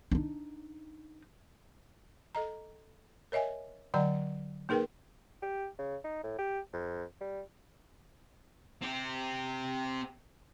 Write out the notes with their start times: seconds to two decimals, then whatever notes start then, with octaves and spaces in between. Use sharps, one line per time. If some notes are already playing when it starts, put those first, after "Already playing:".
0.12 D4 D#4
2.35 A4 D#5 A#5
3.32 A#4 C#5 D#5 E5 G#5
3.94 D3 F#3 D5 F#5 G5 A#5
4.69 A#3 D#4 G#4 A#4 B4 G5
5.42 G4
5.78 C#3
6.04 D#4
6.23 A2
6.38 G4
6.73 F2
7.21 G3
8.82 C4 G4